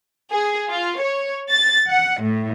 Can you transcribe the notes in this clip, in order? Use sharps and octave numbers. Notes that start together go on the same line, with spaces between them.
G#4
F4
C#5
A6
F#5
A2